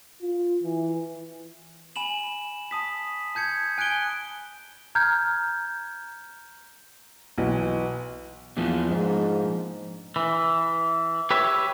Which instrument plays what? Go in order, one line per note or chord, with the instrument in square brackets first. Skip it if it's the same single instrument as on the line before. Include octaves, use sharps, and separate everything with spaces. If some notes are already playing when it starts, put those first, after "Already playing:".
[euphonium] F4
E3
[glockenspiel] G#5 B5 E7 F#7
A5 D#6 B6
A5 G6 G#6 C#7
G#5 F#6 G#6 D7 G7
[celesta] A#5 F6 G6 G#6
[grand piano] B1 E3
[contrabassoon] E2 [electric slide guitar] A#2 F3
[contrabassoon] G#2
[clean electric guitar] E3
G4 B4 C#5 E5